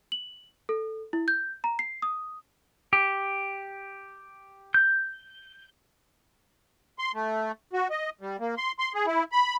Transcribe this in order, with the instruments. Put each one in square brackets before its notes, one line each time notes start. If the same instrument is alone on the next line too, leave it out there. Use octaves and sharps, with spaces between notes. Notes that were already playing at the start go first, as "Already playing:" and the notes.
[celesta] F#7
A4
E4
G6
A#5
C7
D#6
[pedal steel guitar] G4
G6
[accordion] C6
A3
F#4
D#5
G3
A#3
C6
C6
G#4
E4
B5